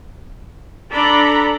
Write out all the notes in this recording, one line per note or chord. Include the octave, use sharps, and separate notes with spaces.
D4 A4 D5 A#5 B5